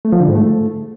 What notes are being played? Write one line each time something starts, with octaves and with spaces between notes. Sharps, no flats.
A3
F3
D3
G#2
A3